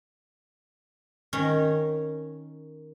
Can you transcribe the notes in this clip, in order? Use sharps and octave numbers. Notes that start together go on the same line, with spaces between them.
D#3 C#4